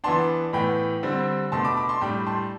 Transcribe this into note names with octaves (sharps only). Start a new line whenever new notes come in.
E3 B3 D4 A5 C6
A2 E3 B3 G5 B5
D3 G3 C4
B2 A3 D4 A5 C6
B5 D6
B5 D6
A5 C6
A2 G3 D4 G5 B5
A5 C6